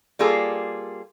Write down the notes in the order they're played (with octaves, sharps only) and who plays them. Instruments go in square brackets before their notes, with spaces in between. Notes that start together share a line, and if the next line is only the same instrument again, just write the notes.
[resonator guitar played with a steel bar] G3 A#3 F4 G#4 A4